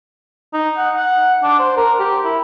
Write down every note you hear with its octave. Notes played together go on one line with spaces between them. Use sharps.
D#4
F#5
F#5
D4
C5
A#4
G4
E4